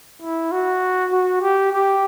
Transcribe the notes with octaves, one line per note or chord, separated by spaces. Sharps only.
E4
F#4
F#4
G4
G4